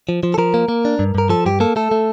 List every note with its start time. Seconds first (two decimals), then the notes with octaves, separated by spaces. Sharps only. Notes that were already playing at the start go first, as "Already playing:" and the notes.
0.09 F3
0.23 F3
0.34 A4
0.38 F3 A#4
0.54 A#3
0.69 A#3
0.85 D4
0.99 G2
1.15 G2 A#4
1.29 F3 A4
1.46 G2 G4
1.60 A#3 A4
1.76 A3 A4
1.91 A3